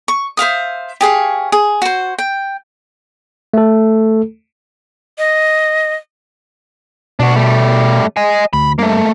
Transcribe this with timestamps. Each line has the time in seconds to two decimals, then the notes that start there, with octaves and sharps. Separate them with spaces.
0.08 C#6
0.37 C5 E5 F5 D#6
1.01 G4 G#4 C#5 F5
1.52 G#4
1.82 F#4 C5
2.19 G5
3.54 A3 A4
5.17 D#5
7.20 B2 D4 F#4
7.36 G3 A3
8.17 D#5 G#5
8.53 D2 B5
8.79 G2 A3 A#3